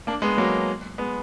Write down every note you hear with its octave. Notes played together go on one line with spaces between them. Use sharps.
A#3 D4
G#3 B3
F#3 A#3
G#3 B3